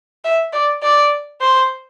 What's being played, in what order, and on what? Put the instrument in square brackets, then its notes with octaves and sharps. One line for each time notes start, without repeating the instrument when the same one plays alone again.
[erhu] E5
D5
D5
C5